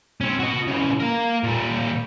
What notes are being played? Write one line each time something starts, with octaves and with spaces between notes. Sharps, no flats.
C4 C#4
F#4 D#5
C#3 E3
A#3 A#4
A#2 G3